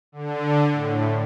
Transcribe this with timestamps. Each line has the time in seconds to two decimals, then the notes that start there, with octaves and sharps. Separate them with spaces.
0.12 D3
0.71 A2